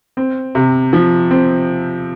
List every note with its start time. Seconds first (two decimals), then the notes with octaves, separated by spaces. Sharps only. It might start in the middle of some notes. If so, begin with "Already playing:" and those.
0.17 C4
0.55 C3
0.93 F3
1.31 C4